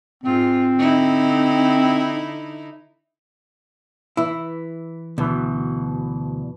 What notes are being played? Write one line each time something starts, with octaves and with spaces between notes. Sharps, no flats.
G#2 C4 F4
D3 D#4 E4
E3 E4
D2 B2 E3